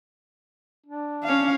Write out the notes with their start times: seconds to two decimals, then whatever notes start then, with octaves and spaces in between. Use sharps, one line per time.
0.87 D4
1.24 C#4 F5